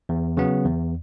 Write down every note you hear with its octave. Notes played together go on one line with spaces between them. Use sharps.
E2
C#3 F#3 B3
E2